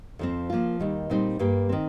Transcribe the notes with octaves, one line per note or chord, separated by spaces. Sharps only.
F2 F3 C4
F3 A#3 F4
D#2 D#3 G3
A#2 G3 C4 D#4 C5
G2 G3 A#3 G4
D#3 C4